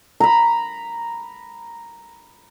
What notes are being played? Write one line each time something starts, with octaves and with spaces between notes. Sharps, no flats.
A#5 B5